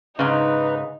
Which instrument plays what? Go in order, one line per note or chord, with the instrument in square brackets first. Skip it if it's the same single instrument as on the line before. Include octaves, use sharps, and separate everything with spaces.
[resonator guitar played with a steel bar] G#2 C#3 [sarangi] D#4 [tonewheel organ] B4